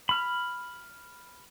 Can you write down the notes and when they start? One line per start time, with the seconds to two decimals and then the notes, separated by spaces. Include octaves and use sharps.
0.09 B5 F6